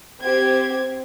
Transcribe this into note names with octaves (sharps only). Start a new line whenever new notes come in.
C4 G4 C5 G#6